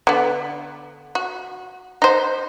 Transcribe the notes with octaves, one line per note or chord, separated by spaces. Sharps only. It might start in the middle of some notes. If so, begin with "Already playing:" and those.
D3 B3
F#4
D#4 C5